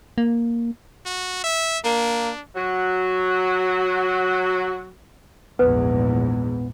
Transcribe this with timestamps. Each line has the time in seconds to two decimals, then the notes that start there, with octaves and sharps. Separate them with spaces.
0.18 A#3
1.06 F#4
1.44 E5
1.85 A#3 D4
2.56 F#3 F#4
5.59 A#1 E2 G#2 B3 B4